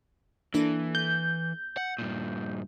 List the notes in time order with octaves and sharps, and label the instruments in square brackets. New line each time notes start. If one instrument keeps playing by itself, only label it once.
[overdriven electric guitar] E3 [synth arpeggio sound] A#3 D4 A4
[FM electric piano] G6
[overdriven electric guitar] F#5
G2 A#2